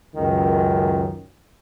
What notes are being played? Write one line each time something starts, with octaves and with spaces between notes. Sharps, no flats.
C#2 F#2 D#3